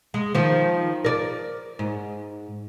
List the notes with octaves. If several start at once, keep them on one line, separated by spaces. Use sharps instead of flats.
G#3
D#3 F3
A#4 D5
G#2